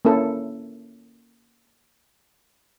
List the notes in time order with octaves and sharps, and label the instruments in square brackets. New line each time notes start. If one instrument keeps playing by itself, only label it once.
[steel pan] A#3 C#4 E4 A4